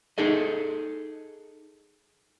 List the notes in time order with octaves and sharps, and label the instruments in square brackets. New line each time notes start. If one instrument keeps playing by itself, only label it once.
[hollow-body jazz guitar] D#4 G#4 A4 D#5